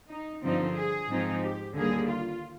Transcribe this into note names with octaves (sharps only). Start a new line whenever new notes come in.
D#4
G2 D3 F3 C4 D#4
G#4
G#2 F3 C4 D#4
G4
D#2 D3 G3 A#3 G#4
F4